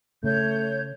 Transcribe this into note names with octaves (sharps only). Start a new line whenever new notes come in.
C#3 A3 C#5 G6